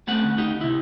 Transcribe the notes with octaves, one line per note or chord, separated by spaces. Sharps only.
G3 A3 C4 C#4 F#5
D2
D#4 G4
C3 E4